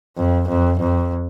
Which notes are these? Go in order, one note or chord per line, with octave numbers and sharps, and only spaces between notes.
F2
F2
F2